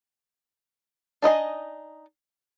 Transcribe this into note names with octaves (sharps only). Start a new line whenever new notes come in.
D4 D#4 D#5 G#5